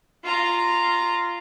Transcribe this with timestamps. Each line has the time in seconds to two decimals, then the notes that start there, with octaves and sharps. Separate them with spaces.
0.24 F4 A#5